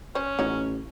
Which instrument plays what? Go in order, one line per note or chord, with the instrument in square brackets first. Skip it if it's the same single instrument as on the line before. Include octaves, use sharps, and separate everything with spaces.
[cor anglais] C#4 [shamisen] C5 C#5
[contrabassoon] A1 [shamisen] D#4 F#4 C#5